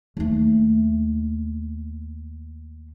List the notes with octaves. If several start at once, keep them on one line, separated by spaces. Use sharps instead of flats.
D#2 A3